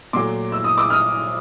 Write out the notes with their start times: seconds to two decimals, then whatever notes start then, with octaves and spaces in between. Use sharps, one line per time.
0.13 A#2 F#3 A3 C6 D6
0.52 E6
0.64 D#6
0.77 D6 E6
0.90 D#6 F6